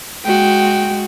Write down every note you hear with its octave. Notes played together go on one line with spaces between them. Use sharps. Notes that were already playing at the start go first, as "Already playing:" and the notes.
G#3 F#4 G5